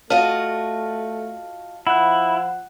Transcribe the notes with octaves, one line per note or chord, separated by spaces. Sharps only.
A3 F4 F#4 D#5 A5 F6
F3 E4 F#5 F#6